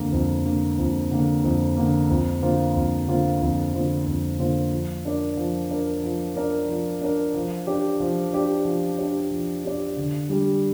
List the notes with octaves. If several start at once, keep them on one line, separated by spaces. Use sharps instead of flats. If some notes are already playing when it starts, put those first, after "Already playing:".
Already playing: F2 D3 A#3
F2
D3 A#3
F2
D3 A#3
F2
D3 A#3
F2
D3 A#3 F4 C5
F2
D3 A#3 F4 C5
F2
D3 A#3 F4 C5
F2
D3 A#3 F4 C5
F3
D4 A#4 D5
F3
D4 A#4 D5
F3
D4 A#4 D5
F3
D4 A#4 D5
F3
D4 G4 D5
F3
D4 G4 D5
F3
D4 G4 D5
F3
D4 G4 D5
D3
G3 D4 G4